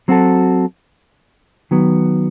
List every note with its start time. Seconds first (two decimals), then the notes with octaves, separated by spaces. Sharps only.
0.08 F#3 C4 F#4 A4
1.71 D#3 F#3 B3